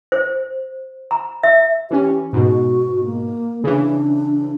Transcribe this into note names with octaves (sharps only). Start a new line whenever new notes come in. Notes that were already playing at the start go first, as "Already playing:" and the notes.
C5
A#5
E5
E3 C#4 G4
G#2 B2 F#4
A#3
C#3 E3 D4